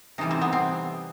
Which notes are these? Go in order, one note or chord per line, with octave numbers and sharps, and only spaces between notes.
C3 E3 G3 D#4
C4
B3
C4